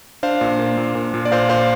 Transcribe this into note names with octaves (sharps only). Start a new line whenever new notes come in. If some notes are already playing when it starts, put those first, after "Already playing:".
D4 C5 F5
A#2
A#3
A#2
A#2
A#2
D5
A#2 C5 F5
A#2 C5 F5